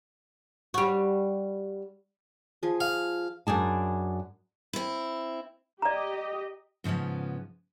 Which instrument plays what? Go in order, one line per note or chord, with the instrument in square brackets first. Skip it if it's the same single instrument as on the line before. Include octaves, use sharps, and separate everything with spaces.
[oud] G3 F#4
[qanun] F3 G#4
[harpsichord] F5
[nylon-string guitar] F#2 D4 G#4 A5
[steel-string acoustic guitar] C4 E4
[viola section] G4 D#5 [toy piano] D5 A#5
[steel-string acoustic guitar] G#2 C#3 F3 B3 C#4